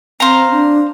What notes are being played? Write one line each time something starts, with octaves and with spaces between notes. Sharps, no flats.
C4 C5 F5 A#5
D4